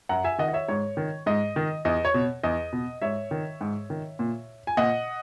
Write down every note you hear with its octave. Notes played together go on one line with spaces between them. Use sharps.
F#2 F#5 A#5
E5 G#5
D#3 D#5 F#5
D#5
C#5 E5
G#2 C#5
D#3
G#2 D#5
D#3
E2 D#5
C#5
B2
E2 D#5
B2
G#2 C#5 E5
D#3
G#2
D#3
A#2
G#5
A#2 D#5 F#5